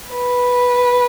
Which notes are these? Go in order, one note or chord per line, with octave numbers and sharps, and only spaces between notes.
B4